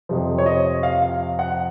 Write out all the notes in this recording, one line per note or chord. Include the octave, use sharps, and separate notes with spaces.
F2 C3 F3
C#5
D#5
F5
F5
F#5